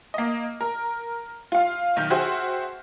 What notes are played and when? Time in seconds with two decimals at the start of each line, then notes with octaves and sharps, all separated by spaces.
0.14 A#3 D#5
0.61 A#4
1.52 F4 F5
1.96 B1 D#3 F6 G6
2.10 F#4 G#4 C5 E5 G5